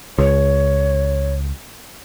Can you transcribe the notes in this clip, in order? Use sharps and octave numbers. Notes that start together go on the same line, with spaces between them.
C#2 C#5